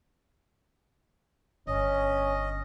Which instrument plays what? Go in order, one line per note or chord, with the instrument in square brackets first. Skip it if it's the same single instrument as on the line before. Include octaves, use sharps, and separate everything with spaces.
[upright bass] G1 [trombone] C#4 [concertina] D#5